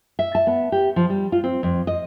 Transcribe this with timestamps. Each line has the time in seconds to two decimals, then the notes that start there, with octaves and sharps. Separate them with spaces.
0.19 E5
0.35 A5
0.47 B3
0.72 G4
0.96 F3
1.10 G3
1.32 F4
1.44 C4
1.63 F2
1.87 D#5